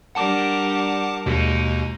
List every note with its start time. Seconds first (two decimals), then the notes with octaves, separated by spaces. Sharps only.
0.15 G3 D4 A#4 F#5 A5 D6
1.26 D#2 B2 G#3 D#4